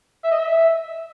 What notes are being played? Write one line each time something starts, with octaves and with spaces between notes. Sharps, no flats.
E5
D#5
E5